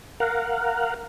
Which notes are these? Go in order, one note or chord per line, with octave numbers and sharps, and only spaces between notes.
A#4 F5 F#5